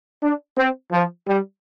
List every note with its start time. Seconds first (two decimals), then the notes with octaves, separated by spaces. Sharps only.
0.22 D4
0.57 C4
0.92 F3
1.27 G3